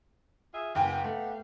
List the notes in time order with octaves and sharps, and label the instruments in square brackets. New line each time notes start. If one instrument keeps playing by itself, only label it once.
[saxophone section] F4 G#4 E5
[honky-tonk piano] F#1 G5 G#5 [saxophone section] B3 G4 F5
[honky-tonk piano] A3